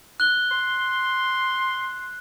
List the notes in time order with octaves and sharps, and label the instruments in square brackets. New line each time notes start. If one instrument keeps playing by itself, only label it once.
[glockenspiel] F#6 G7
[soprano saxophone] C6